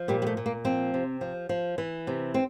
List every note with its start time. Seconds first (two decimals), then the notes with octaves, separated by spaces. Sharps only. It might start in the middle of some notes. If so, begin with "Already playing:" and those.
Already playing: F3
0.08 A#2 G3
0.22 G3
0.27 A3
0.37 A#2
0.46 A#3
0.65 F3 C4
0.94 C3
1.21 F3
1.49 F3
1.78 E3
2.07 C3
2.34 C4